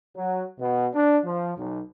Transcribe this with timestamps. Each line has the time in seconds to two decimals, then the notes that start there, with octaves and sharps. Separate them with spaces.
0.16 F#3
0.60 B2
0.94 D4
1.25 F3
1.57 B1